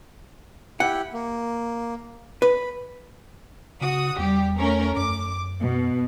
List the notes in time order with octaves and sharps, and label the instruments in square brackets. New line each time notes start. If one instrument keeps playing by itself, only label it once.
[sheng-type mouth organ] E4 G4 G5 [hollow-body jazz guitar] F#5
[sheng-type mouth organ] A#3
[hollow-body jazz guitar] B4 [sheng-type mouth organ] B5
[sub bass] C#3 [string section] F#4 D#6
[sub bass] E2 [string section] G3 G4
[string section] A3 C#4 A#4
[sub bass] F#2 [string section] D6
[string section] B2